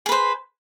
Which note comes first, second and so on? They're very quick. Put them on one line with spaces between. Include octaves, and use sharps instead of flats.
G#4 B4 C5